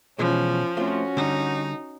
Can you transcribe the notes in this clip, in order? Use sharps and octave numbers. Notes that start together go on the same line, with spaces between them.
B2 E3 F3 G#3 C#4
A3 C4 C#4 F4 F#4
D3 G3 D#4